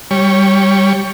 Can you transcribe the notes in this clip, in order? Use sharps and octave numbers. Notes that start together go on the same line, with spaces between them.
G3 C#5